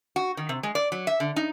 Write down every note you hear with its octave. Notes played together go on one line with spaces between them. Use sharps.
F#4
D#3
C3
G#3
D5
F#3
E5
D3
D#4